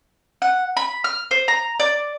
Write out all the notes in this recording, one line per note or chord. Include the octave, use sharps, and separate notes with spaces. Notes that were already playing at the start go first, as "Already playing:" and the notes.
F#5
B5
F6
C5
A#5
D5